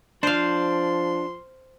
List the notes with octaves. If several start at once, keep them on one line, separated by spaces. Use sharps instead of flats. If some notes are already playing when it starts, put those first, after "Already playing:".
F3 D4 C5 F5 C6